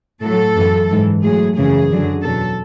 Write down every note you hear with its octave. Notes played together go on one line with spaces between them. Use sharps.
A2 F#3 A4
F#2 E3
G#2 E3
A2 F#3 G#4
F#2 C#3 E3 G#4
F#2 D3 F#3
E2 B2 F#3 A4